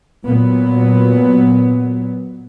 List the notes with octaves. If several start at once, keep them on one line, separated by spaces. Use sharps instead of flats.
A#2 F#3 B3